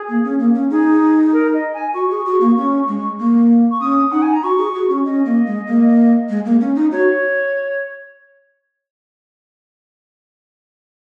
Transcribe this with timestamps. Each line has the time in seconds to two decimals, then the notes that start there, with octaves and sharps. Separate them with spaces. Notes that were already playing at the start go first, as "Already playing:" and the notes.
Already playing: G#4
0.09 A#3
0.24 C#4
0.39 A#3
0.54 C#4
0.70 D#4 G#4
1.32 A#4
1.53 D#5
1.73 G#5
1.94 F#4 C#6
2.11 G#4
2.26 F#4
2.41 A#3
2.57 C#4
2.88 G#3
3.19 A#3
3.71 C#6
3.80 C#4 D#6
4.11 D#4 F#5
4.22 G#5
4.33 A#5
4.43 F#4 C#6
4.58 G#4
4.75 F#4
4.89 C#4
5.05 C#4 D#5
5.25 A#3
5.46 G#3
5.67 A#3
6.29 G#3
6.45 A#3
6.61 C#4
6.76 D#4
6.91 F#4 C#5